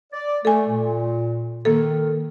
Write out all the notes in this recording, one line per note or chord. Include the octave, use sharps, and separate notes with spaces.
D5
A3 A4 G#5
A#2
D#3 A#3 A4